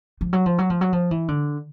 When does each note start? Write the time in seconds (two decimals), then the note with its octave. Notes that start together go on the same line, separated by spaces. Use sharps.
0.21 F3
0.33 F#3
0.46 F3
0.58 F#3
0.70 F3
0.81 F#3
0.93 F3
1.11 E3
1.28 D3